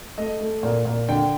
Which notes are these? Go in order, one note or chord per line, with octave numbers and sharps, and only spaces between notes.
A3 D#5
A3
A#2
A#2
D3 G5